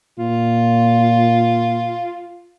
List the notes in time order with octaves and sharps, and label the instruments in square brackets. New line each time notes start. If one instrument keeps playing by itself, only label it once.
[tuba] A#2 [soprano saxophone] F4